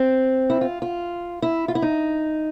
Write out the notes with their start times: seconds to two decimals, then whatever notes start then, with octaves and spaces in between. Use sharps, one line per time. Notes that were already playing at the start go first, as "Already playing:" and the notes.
Already playing: C4
0.50 E4
0.61 F4
0.82 F4
1.42 E4
1.68 F4
1.75 E4
1.82 D#4